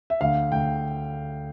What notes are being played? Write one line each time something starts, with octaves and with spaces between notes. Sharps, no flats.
E5
D2 F5
D2 G5